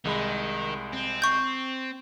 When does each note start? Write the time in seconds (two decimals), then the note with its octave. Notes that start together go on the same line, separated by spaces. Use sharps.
0.05 C2 D#3 G#3 B5
0.93 C4
1.22 C#6 G6